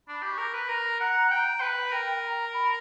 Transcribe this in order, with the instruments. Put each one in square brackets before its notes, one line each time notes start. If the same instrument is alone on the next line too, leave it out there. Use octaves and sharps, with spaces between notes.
[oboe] D4 [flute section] B5
[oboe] G4
[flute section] C#6
[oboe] A#4
B4
[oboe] A#4 [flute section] A#5
[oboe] F#5
G5
B4
[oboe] A#4 [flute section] G5
[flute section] A#5
B5